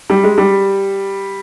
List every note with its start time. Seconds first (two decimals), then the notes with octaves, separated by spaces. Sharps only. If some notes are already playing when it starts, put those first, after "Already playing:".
0.10 G3
0.24 G#3
0.38 G3